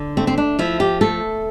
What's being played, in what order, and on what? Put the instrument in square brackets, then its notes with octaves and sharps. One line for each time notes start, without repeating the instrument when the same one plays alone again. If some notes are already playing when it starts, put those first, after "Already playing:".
Already playing: [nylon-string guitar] D3
A3 C4
C4
D4
F3 E4
G4
A3 A4